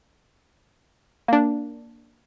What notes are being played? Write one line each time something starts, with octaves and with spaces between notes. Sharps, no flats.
A#3 D4